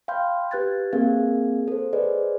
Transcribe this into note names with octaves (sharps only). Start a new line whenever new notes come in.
F5 G5 B5 C6 F6 G6
G4 B4 F#6 G#6 A6
A#3 C4 G#4 A#4 F5 G#6
A4 C5
G#4 B4 C5 D5 D#5